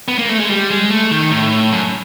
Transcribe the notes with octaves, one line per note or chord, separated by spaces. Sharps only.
B3
A#3
A3
G#3
G3
G#3
A3
D#3
A2
F#2